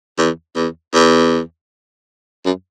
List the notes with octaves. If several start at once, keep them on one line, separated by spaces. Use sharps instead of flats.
E2
E2
E2
F#2